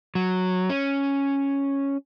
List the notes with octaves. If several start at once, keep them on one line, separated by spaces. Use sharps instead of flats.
F#3
C#4